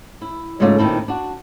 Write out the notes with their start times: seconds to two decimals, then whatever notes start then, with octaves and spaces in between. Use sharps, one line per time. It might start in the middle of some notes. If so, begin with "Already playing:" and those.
0.21 E4
0.60 G#2 C#3 G#3 A3 F4 D5
0.78 A#2 D#3 C4 E4 A4
1.08 D4 F#4